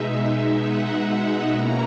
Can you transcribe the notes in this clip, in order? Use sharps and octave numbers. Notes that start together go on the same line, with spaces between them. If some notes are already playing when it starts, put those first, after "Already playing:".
Already playing: B2 G#3 D#4 E5
F#5
B2 A#3 C#4 E4 A#5